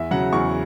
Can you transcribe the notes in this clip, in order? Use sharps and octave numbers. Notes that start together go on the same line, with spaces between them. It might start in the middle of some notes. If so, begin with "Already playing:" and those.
Already playing: E2 E5
C#3 F#3 F#5
E2 C#6